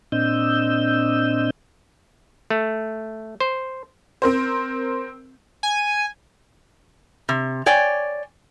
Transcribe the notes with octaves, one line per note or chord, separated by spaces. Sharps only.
A#2 C4 D4 D#5 E6 G6
A3
C5
C4 A#4 C5
G#5
C3
C#5 D5 G5 G#5